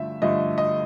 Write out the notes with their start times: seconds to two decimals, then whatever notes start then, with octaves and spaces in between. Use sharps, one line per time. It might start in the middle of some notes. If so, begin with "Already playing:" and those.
Already playing: G2 D3 F3 A3 E5
0.22 G2 D3 F3 A3 D#5
0.58 D#5